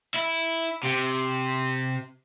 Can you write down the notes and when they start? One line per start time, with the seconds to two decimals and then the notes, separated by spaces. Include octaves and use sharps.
0.14 E4
0.83 C3